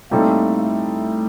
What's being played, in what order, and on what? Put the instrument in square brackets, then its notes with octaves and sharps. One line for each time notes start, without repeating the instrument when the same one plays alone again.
[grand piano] A2 G3 C4 D#4 A4 [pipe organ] A#3
[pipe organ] A3